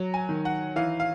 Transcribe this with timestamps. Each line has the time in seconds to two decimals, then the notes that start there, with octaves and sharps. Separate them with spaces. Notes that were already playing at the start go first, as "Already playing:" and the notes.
Already playing: F#3
0.14 G#5
0.29 D#3
0.45 F#5
0.76 E3 F5
1.00 F5